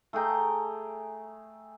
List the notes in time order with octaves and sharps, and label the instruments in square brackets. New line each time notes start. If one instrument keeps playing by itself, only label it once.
[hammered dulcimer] A3 G#4 G5 A#5